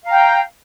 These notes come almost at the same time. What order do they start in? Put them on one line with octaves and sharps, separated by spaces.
F5 A#5 G5